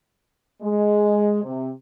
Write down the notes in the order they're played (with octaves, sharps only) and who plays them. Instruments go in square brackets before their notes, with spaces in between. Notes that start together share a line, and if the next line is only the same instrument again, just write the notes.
[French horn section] G#3
C3